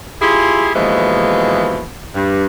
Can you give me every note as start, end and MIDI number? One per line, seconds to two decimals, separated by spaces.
0.21 0.70 64
0.21 0.70 65
0.21 0.70 67
0.21 0.70 68
0.74 1.85 39
0.74 1.85 47
0.74 1.85 52
0.74 1.85 53
0.74 1.85 56
2.14 2.46 43